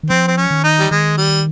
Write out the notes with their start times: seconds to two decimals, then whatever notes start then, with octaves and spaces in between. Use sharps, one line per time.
0.03 D#3
0.10 F3 C4
0.27 C4
0.37 C#4
0.51 D#3
0.64 D#4
0.79 G3
0.91 D#3 G#3
1.18 G3